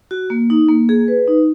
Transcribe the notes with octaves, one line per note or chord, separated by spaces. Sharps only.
F#4
A#3
D#4
A#3
G#4
B4
D#4